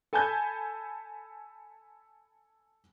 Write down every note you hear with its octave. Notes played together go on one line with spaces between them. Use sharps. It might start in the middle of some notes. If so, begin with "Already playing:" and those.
A4 G#5 A5 B5 G6 G#6